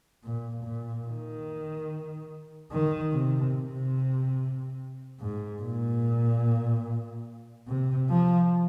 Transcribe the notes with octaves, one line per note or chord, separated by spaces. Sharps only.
A#2
A#2
D#3
D#3
C3
C3
G#2
A#2
C3
F3